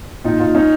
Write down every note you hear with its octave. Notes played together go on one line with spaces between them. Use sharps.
A#2 D#4 F4
A#2 D#4 F4
C#4 D#4